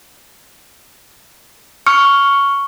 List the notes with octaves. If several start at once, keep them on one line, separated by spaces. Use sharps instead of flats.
C#6 F6 C#7